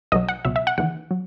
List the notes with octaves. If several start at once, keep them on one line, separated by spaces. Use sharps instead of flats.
B1 B2 F#3 D#5
F#5
C#2 B2 F#3 E5
E5
F#5
D#2 C#3 E3 F#5
F#3